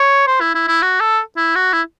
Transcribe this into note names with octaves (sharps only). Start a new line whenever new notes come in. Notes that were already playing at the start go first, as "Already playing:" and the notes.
Already playing: C#5
C5
E4
E4
E4
F#4
A4
E4
F#4
E4